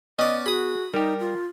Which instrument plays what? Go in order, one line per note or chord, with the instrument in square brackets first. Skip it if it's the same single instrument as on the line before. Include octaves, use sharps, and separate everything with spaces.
[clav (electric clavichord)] B3 [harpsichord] C#4 D5 [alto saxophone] D#5
[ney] F#4 [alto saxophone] G#4 [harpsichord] B5 D#6
[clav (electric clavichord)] G3 G4 [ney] D#4 [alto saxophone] A#4
[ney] F4